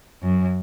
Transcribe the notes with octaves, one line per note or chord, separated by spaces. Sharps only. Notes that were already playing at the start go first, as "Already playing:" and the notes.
F#2